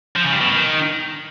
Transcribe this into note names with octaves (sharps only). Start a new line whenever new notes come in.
F3
C#3
G2
B2
D#3